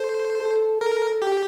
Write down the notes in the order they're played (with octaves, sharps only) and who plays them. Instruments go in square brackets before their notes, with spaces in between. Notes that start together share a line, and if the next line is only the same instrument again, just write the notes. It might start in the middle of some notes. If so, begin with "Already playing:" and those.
Already playing: [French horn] A4 [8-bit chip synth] C5
[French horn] A4
[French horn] A4 [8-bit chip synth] A#4
[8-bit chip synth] G4